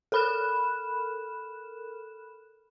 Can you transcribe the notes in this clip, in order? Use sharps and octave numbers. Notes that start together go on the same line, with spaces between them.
A4 A#4 B5 F6 F#6 E7